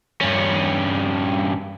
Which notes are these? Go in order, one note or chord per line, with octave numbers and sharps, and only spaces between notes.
G2 C#4